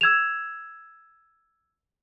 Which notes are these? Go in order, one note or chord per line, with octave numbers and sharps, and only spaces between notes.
E6 G#6 E7 F7